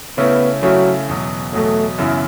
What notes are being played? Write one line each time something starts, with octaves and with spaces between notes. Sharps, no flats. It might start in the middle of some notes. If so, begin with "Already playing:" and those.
C#3 A3 B3 C#4 E4
C#3 F#3 A3 C#4 E4
E2 B2 F#3
E2 B2 F#3 A3
F#2 C#3 E3 B3 E4